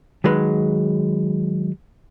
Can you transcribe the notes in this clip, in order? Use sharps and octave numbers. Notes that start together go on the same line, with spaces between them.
D#3 F#3 G#3 B4